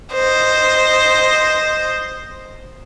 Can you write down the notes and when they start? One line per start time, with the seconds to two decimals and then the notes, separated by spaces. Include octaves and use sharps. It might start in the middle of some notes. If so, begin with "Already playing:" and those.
0.14 C5 D#5